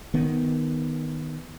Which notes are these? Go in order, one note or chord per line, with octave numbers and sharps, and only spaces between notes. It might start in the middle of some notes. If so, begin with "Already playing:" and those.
D#3 B3